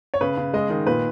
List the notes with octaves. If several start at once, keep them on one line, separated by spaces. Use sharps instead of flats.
C#5
C#3 B4
C#3
G#3 D#5
D#3
A#2 B4